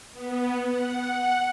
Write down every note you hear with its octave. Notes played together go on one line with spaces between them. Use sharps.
B3
F#5
F#5